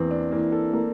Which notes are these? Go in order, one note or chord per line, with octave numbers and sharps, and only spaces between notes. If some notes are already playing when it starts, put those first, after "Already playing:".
Already playing: E2 A#3 C4
D4
E3 A#3
A4
A#3